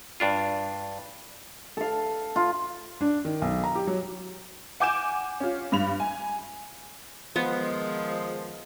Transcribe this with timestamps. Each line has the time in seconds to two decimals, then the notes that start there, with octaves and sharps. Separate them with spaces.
0.20 G2 D4 F4
1.77 A4 F5
2.36 F4
3.01 D4
3.25 D#3
3.42 B1
3.64 A#5
3.75 G4
3.87 F#3
4.80 F#5 G#5 D6 G6 D7 E7
5.40 C#4 F4
5.72 G2 B5 F7
6.00 G#5
7.36 D#3 F3 G#3 B3